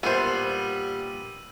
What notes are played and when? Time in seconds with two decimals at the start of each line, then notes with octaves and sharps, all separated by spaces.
0.03 A#2 G3 B3 D4 C5 E6 D#7